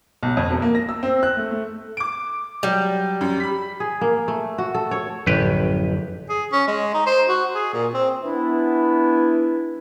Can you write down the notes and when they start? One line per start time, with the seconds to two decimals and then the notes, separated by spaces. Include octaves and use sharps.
0.23 B1
0.37 F2
0.50 E1
0.62 A#3
0.75 A#6
0.89 E6
1.03 C4
1.23 F#6
1.37 A3
1.51 A3
1.97 D6 D7
2.63 F#3 G3
3.21 F#2
3.40 B5 B6
3.80 G#4
4.01 A#3
4.28 A3
4.58 F#4
4.74 A4
4.91 C#5
5.26 A1 F#2 D3 F3 G4 B4
6.29 G#4
6.52 C#4
6.67 G#3
6.94 D#4
7.06 C5
7.29 F#4
7.55 G#4
7.73 A#2
7.94 C4
8.23 E3 B3 D4 E4